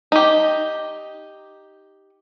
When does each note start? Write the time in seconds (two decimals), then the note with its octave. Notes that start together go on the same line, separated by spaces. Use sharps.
0.12 D#4 G4